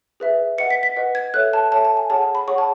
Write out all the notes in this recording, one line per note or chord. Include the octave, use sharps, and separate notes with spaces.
G#4 B4 E5
B4 D#5 F#5 C#7
B6
B6
B4 D#5 F#5
G#6
A4 C#5 E5 F#6
A5
A4 C#5 E5 A5
A5
G#5
G#4 C#5 F#5 A5
A5
B5
G#4 C#5 F#5 C#6
A5